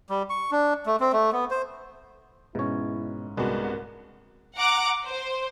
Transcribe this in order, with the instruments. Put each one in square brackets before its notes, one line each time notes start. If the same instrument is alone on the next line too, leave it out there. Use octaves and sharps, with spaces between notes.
[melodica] G3
C#6
D4
A3
C4
A3
B3
C5
[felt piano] G#2 C#4 [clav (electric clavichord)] B2 C#5 [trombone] E4
[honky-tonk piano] C2 F#4 [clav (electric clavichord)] G#3 B3 D4 [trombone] A#4
[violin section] F#5 A#5 D6
C5